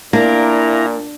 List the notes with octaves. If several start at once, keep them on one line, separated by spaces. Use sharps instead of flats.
A#2 A#3 D4 E4 A#5